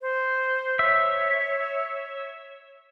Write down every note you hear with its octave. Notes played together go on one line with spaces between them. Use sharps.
C5
C#5 E5